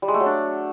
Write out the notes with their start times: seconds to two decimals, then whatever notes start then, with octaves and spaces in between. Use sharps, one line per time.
0.02 G3
0.08 G#3
0.14 A3
0.20 F#3
0.26 D4